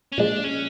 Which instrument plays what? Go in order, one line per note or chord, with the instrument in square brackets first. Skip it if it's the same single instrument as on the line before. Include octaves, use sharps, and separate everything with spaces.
[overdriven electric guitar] C#4
[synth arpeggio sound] A#2 F3 G#3 [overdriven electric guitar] D4
[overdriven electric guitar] C#4